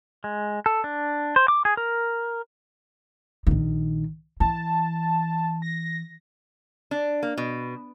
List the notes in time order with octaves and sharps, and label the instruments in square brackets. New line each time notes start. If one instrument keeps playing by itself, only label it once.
[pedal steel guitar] G#3
A4
D4
C5
D6
G#4
A#4
[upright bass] A#1 D#3
[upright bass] E3 [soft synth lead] A5
[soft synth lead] A#6
[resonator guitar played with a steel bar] D4
A#3
B2